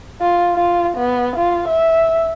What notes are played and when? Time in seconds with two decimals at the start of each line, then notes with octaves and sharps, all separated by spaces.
0.21 F4
0.55 F4
0.97 B3
1.36 F4
1.69 E5